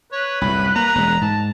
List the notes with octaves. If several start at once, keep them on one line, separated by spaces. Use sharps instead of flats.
B4 C#5
C2 F#2 A2 B5
A#3 A#5
E1 G#3
G#2 A5